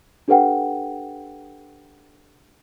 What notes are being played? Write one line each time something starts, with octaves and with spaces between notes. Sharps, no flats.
D4 G4 A4 B4 F#5 G5